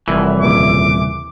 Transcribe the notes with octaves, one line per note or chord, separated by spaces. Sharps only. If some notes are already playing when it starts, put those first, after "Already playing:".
F1 C2 E3
D#2 A#2 C#3 D6